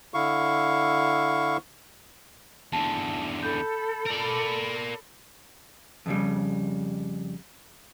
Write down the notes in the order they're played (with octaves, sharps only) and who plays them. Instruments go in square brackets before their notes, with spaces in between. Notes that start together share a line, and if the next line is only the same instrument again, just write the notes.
[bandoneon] D3 E4 F5 C#6
[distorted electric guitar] E2 D3 [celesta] A5
[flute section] A4 B5 [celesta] G6
[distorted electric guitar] A#4 D5
[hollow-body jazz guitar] F2 C#3 G3